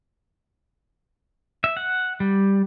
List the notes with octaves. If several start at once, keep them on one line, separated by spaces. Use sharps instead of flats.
E5
F#5
G3